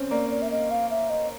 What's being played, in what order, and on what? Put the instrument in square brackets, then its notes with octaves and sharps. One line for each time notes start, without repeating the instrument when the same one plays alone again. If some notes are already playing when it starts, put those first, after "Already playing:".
Already playing: [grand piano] C4 C#4
[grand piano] A#3 [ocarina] D5
[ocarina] D5
E5
D#5
F5
E5
D#5